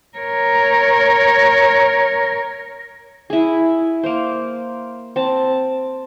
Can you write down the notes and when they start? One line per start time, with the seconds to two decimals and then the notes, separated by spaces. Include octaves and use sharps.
0.18 A#4 C#5
3.30 E4 G#4
4.04 A#3 C5
5.16 C4 A5